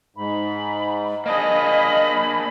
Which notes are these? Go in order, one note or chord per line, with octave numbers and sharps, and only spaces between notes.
G#2 B5
A#3 D4 G#4 D#5 B5